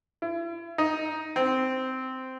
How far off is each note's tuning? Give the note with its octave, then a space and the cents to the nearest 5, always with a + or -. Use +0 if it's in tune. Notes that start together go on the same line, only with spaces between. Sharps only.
E4 +40
D#4 +10
C4 -10